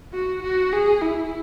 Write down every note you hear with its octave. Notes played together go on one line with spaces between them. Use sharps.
F#4
F#4
G#4
E4